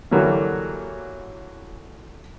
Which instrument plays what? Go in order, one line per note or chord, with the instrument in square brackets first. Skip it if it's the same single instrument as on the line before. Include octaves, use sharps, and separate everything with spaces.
[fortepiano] D3 E3 F#3 G3 A#3